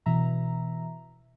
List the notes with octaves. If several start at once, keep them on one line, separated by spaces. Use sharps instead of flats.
B2 E3 E5 A#5